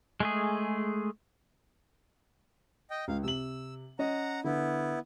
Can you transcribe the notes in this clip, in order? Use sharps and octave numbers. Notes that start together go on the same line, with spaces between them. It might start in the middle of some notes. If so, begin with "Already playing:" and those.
G#3 A3 G#4
D#5 G5
C#2 F5
C3 E6 F#7
C#4 D#5 F#5 A#5
D3 B3 E4